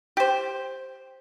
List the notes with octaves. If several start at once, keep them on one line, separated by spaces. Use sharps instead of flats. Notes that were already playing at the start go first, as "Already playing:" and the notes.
G4 C5